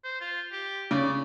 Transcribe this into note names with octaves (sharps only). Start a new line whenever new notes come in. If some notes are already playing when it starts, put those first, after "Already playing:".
C5
F4
G4
C#3 D5